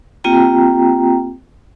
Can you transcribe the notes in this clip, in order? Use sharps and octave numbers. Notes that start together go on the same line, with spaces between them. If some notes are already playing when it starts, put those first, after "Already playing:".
A#3 C4 F4 G4 G5 A#5